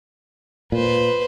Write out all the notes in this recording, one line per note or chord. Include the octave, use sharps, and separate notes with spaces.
A#2 B4 C5